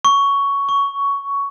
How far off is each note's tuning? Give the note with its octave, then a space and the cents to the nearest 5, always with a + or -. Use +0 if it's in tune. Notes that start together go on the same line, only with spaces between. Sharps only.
C#6 +10
C#6 +15